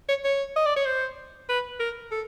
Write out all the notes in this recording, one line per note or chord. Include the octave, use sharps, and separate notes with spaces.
C#5
C#5
D#5
D5
C#5
C5
B4
A#4
A4